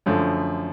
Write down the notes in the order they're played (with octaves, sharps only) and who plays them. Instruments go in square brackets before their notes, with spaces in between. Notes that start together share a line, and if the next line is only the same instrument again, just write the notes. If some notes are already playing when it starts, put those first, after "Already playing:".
[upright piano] F#2 D3 F3 A3